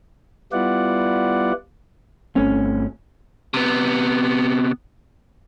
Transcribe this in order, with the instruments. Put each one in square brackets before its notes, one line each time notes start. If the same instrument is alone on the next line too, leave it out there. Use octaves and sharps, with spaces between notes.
[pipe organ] G3 B3 E4 F4 D5 F#5
[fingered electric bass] G1 A3 C4 [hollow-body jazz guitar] C#4
[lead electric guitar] C3 B3